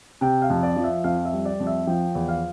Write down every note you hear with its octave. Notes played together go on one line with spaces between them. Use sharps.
C3 G5
F5
F2
D5
F3
E5
F2 F5
E5
G3
D5
F2
E5
F3 G5
E2
F5